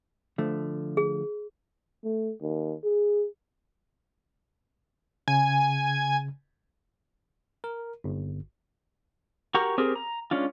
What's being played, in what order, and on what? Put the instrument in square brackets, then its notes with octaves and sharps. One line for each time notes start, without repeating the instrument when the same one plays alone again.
[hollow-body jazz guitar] D3 F3 A3
[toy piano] G#4
[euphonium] A3
D#2
G#4
[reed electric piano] C#3 [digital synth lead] G#5
[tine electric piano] A#4
G1
[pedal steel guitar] F#4 G4 A#4 A#5 C#6
C4 G4 G#4 A#4
A#5
G#3 C#4 D4 F4